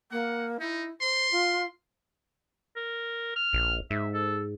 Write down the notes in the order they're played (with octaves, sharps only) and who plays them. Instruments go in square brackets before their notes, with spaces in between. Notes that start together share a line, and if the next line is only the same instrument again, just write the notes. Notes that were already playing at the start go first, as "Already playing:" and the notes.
[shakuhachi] A#3 [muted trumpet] F#5
[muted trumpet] D#4 [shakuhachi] E4
[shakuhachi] C5 [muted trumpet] C6
[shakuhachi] F4
[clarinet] A#4
F6
[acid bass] A#1
[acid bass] G#2 [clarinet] E5
[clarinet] A4